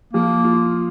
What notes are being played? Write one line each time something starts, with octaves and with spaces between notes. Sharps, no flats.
F3 A#3
F4